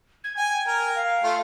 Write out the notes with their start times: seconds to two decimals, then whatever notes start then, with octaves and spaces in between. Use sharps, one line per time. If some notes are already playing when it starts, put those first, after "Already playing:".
0.24 G#6
0.37 G5 G#5
0.67 A#4
0.95 F5
1.24 A3 F4